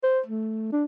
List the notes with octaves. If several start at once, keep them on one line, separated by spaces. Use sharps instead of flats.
C5
A3
D4